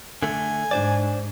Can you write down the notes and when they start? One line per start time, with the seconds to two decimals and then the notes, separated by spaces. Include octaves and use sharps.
0.23 D3 A3 G#5
0.71 G#2 D4 C5 D5